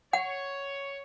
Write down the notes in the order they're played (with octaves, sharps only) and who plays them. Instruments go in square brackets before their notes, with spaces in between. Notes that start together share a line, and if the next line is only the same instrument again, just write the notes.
[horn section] C#5 [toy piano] F#5